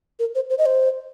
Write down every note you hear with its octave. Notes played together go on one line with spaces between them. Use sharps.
A#4
C5
C5
D#5
C5